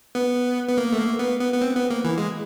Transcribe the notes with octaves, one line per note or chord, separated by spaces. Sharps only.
B3
B3
A#3
A3
A#3
B3
B3
B3
C4
B3
A#3
E3
G#3